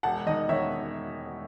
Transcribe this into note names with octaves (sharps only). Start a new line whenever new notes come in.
E1 F#5 A5
D#3 D#5
D#3 C#5 E5